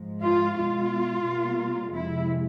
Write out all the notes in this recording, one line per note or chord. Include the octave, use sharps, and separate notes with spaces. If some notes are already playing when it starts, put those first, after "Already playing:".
Already playing: G#2 F3 G#3
F4
B2 G#3 F4
B2 G3 A#3
F2 C3 F3 G#3 E4